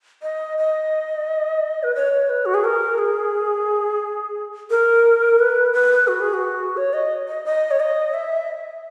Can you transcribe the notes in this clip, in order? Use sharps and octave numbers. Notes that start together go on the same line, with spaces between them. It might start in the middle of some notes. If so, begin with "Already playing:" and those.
D#5
D#5
B4
C#5
B4
F#4
G#4
A#4
G#4
A#4
B4
B4
F#4
G#4
F#4
C#5
D#5
D#5
D#5
C#5
D#5
E5